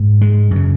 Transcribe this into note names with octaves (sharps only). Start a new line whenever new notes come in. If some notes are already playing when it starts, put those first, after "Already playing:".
Already playing: G#2
G#3
F#2 C#3